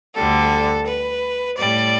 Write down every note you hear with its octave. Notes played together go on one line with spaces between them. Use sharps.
D2 D3 G3 A4
B4
A2 G3 D5